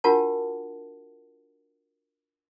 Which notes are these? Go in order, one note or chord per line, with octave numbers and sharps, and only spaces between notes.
D4 F4 F#4 A#4 F#5 A5